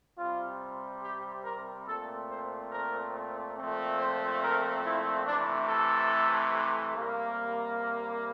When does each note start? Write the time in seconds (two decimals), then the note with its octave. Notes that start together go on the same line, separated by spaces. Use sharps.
0.18 C3 G3 C4 F4
1.04 G4
1.45 A#4
1.87 A#2 A3 C4 A4
2.30 C5
2.72 A#4
3.56 A#2 F3 A3 C4
3.99 C5
4.42 A#4
4.84 E4
5.26 C3 E3 A3 D4
5.68 A4
6.96 C3 G3 A#3
7.80 A#4